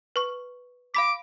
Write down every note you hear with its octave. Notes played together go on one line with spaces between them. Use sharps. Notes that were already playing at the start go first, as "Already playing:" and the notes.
B4 C#6
F5 B5 D6 B6